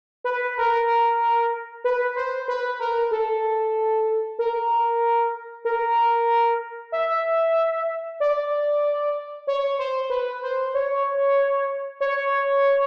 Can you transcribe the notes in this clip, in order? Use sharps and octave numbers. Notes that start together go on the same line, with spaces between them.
B4
A#4
B4
C5
B4
A#4
A4
A#4
A#4
E5
D5
C#5
C5
B4
C5
C#5
C#5